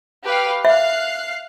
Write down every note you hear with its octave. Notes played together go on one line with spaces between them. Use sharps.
G4 B4 F5
E5 F5 F#6 C7